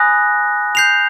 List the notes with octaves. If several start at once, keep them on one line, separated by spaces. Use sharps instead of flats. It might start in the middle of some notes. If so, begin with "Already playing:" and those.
Already playing: G#5 B5 D#6 F#6 A#6
G6 C7 F7